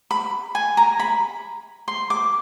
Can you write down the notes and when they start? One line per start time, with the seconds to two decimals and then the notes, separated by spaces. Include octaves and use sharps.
0.11 B5
0.55 G#5
0.77 A#5
1.00 B5
1.88 C6
2.10 D6